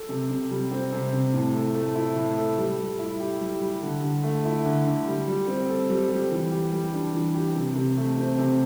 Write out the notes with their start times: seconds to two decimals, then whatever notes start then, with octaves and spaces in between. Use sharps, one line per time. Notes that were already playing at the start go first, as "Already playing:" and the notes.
Already playing: A4
0.09 C3
0.30 C3
0.51 G3
0.71 C4
0.93 C3
1.13 C3
1.33 A2
1.54 A4
1.75 A3
1.95 E4
2.16 A2
2.37 A4
2.58 G3
2.79 G3
2.99 E4
3.20 G4
3.41 G3
3.61 G3
3.82 D3
4.03 D3
4.24 A3
4.45 E4
4.65 D3
4.86 D3
5.07 G3
5.27 G3
5.48 C4
5.69 A4
5.90 G3
6.10 G3
6.32 E3
6.51 G4
6.72 G3
6.93 D4
7.14 E3
7.35 G4
7.55 C3
7.76 C3
7.97 A3
8.18 C4
8.38 C3